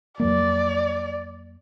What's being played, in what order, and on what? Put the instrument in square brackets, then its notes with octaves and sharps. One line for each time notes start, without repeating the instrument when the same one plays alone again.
[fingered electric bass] F2 F#3 A#3 [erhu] D5